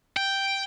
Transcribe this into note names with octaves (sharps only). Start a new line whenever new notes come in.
G5